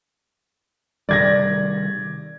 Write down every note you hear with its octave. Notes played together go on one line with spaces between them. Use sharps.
C3 D#3 G3 D5 G#6 A#6